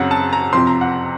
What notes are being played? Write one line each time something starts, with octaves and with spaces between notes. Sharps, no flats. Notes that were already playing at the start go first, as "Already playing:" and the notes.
Already playing: F#2 C#3 F#3 C4 F#5
A5
A#5
F2 C3 F3 C4 C6
A#5
F#5